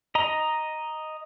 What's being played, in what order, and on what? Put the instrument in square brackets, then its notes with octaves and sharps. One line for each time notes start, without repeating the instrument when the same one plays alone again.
[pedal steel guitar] D#5 A#5